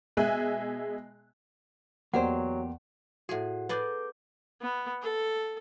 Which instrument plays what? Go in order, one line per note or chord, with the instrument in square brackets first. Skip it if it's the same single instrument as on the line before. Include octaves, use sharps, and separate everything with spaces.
[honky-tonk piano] B2 G#3 G#4 E5 G#5 F#6
[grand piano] E2 [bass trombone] F#3 [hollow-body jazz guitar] A#3 G4 C5 [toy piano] D5 F#5
[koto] A2 G#4 [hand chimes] F#4 F#5
[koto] B3 G#4 D5 [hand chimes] A4 D6 G6
[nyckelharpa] B3
A4